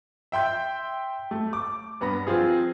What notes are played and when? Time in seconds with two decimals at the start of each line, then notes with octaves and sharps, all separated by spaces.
0.32 E5 G5 C6 G6
1.31 A3
1.53 D6
2.01 G2 B3 B5 A#6
2.27 F3 C4 F4 G#4